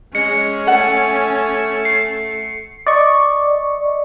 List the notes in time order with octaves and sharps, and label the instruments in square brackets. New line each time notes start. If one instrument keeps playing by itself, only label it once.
[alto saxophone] G#3 [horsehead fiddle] C#4 [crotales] C#7
[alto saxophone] A3 [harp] F#5
[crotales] C7
[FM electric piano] D5 D#5 C#6